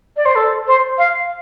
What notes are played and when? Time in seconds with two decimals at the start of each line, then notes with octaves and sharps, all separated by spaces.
0.17 D5
0.26 C5
0.36 A4
0.67 C5
0.98 F5